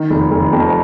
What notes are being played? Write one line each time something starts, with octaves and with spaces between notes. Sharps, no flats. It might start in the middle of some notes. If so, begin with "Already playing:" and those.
Already playing: D#3
F1
F1
F2